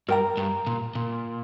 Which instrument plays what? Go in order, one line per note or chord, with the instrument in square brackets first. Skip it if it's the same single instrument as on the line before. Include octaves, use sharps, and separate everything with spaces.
[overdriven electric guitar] G2 [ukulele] A#4 G5 A#5
[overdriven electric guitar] G2
A#2
A#2